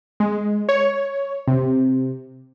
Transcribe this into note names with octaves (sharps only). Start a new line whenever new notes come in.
G#3
C#5
C3